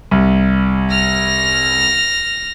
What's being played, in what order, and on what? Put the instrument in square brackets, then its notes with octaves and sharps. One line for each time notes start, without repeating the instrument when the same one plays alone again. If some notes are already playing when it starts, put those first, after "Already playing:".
[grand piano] C2
[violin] F6 A#6